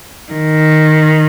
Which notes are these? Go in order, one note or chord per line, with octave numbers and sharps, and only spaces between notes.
D#3